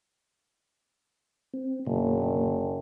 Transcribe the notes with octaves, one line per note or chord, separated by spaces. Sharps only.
C4
F#1 B2 D3 A#3